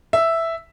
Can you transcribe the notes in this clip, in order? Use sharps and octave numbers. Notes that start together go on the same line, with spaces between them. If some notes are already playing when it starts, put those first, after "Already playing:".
E5